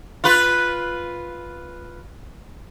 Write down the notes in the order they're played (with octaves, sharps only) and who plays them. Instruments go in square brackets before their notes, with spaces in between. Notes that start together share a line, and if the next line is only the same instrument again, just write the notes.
[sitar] F4 B4